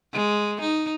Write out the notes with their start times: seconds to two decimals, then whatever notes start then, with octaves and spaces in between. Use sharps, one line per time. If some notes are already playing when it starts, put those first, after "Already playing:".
0.13 G#3
0.61 D#4